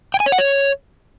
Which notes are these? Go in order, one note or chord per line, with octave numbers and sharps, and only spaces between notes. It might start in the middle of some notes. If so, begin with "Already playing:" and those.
G5
G#5
C#5
F#5
C#5